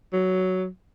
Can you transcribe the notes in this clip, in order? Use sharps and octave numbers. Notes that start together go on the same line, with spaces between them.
F#3